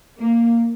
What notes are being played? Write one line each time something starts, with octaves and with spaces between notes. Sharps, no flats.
A#3